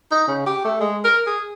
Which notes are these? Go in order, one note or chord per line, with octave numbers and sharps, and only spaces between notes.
D#4
C#3
G4
A3
G#3
A#4
G#4